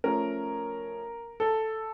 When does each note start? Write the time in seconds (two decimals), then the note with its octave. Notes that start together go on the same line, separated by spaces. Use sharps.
0.04 F3 A3 C#4 A#4
1.40 A4